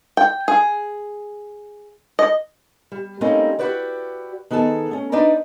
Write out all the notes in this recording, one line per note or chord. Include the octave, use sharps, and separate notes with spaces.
G5
G#4
D#5
G3
G3 A3 A#3 C4 C#4 D#4
E4 F#4 G4 B4 D5
D#3 B3 G#4 A4 A5
A3 C#4
D4 D#4 B4 D5 A#5